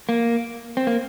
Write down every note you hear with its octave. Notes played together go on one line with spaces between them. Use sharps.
A#3
C4
A#3